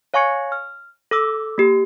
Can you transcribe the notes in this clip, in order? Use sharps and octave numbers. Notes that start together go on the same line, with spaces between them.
C#5 F5 G#5 C#6 G#6 C#7
F6
A4 D6 E6
A#3 G4